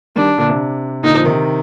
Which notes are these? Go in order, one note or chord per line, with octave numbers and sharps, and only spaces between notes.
D#3 G3 D4
A#2 D3
C3
A#2 D3 D#4
F3
C3 D#3